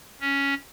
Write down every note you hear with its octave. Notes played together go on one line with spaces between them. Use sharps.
C#4